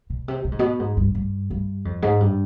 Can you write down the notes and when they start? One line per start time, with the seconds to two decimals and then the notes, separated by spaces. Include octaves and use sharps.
0.10 B2
0.28 C3
0.45 B2
0.52 G#2
0.59 B2
0.79 G#2
0.97 G2
1.15 G2
1.50 G2
1.85 F2
2.02 G#2
2.20 G2